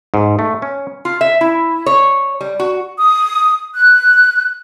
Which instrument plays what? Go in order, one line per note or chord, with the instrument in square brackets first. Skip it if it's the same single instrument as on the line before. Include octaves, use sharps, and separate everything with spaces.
[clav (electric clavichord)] G#2
A3
C#4
[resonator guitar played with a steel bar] F4
E5
E4
C#5
G3
F#4
[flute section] D#6
F#6